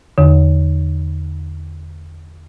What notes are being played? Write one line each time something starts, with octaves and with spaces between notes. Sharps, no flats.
E2 D3